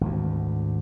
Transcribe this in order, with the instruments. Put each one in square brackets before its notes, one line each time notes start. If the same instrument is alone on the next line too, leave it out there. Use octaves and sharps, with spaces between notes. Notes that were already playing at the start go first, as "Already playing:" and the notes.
[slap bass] G#1 D2